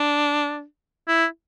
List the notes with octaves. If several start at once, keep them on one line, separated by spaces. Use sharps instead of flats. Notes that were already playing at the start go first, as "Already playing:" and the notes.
Already playing: D4
E4